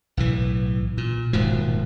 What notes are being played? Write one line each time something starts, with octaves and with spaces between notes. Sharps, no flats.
B1 A2 E3
A#2
D#1 G#2 B2 F3